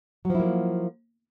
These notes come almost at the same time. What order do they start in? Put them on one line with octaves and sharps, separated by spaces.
F#3 F3 E4 A#3